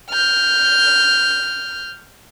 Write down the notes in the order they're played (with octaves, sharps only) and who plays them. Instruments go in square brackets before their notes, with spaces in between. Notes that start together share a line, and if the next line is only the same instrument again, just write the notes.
[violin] F6 G6